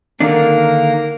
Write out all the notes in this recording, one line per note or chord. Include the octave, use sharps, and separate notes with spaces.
D3 D#3 A#3 D4 A#4